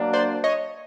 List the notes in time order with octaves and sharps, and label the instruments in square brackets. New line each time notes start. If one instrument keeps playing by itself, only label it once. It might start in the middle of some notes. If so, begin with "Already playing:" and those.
Already playing: [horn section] F#3 A#3 D4
[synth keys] C5 D5
C#5 D#5